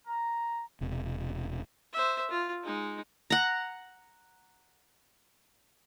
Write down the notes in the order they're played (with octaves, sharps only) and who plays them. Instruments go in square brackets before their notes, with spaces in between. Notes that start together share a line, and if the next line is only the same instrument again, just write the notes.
[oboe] A#5
[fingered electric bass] E1 C3
[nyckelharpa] C5 E5
F4
G#3 D#4
[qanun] F#5 A#5